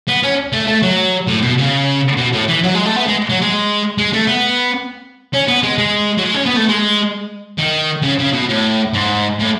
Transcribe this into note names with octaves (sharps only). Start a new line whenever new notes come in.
B3
C#4
A3
A3
F#3
A2
B2
C#3
B2
A2
E3
F#3
G#3
A3
B3
G#3
F#3
G#3
G#3
A3
B3
C#4
B3
G#3
G#3
F#3
G#3
C#4
B3
A3
G#3
D#3
C#3
C#3
B2
A2
G#2
A2